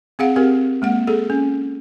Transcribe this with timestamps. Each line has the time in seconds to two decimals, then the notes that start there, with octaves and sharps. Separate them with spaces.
0.19 C4 G#4 F5 F#5
0.36 C4 G4 A#4
0.82 G#3 A#3 F#5
1.07 G#4 A4
1.30 C#4